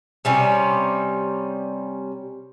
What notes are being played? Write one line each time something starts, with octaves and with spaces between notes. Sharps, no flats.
C3 G3 C#4